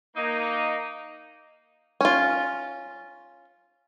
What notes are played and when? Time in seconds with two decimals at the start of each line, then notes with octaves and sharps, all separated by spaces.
0.16 A#3 D#4
2.01 C#4 F4